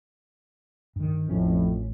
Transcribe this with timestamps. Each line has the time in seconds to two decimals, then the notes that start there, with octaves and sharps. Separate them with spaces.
0.96 G2 D#3
1.28 A1 F2 A2 C#4